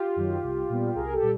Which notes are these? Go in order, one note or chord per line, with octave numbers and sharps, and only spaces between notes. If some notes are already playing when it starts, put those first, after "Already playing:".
Already playing: F4 G4
F#2 D#3 F#3
C2
A#2 G3 B3
C2 G#4 A#4
G4 A4
A#2 G3